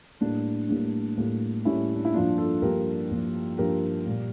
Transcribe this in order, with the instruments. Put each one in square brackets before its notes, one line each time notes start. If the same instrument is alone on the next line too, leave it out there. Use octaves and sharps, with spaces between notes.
[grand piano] A2 G3 A#3 D4
A2 G3 A#3
A2 G3 A#3
A2 G3 A#3 C#4 E4
D4
E4
G2 F3 A#3 D4 F4
F4 A4
G2 F3 A#3 G4 A#4
G2 F3 A#3
G2 F3 A#3 G4 A#4
A#2 G3 A#3